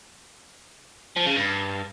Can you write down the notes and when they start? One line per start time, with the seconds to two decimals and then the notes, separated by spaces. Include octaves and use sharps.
1.17 F3
1.26 C#3
1.36 G2